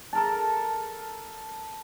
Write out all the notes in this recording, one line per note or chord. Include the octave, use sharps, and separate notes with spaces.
A4 A#4 A5